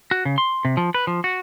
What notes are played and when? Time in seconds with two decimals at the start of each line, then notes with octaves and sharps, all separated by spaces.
0.11 F#4
0.25 C#3
0.38 C6
0.65 C3
0.77 F3
0.94 B4
1.07 F3
1.24 F#4